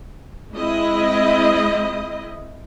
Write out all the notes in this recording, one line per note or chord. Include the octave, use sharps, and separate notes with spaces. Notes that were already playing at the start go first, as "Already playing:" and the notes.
G#3 C4 E4 D#5